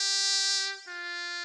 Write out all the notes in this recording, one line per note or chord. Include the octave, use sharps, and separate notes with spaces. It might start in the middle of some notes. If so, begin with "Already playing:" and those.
Already playing: G4
F4